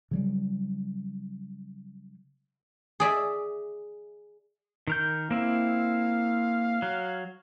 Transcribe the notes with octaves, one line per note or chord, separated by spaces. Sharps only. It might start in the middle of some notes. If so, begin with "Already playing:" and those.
C#3 F#3 G3
G#4 D5 E5
D#3 A#4 G6
A#3 C4 E4 F5
F#3